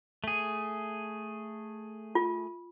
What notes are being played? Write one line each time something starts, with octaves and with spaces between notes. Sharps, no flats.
A3 G#4
F4